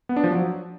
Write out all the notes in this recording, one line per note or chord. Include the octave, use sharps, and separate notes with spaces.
B3
D4
F3
F#3